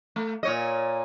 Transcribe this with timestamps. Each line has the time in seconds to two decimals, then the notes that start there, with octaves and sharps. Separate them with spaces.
0.16 A3
0.43 A#2 C#5 D#5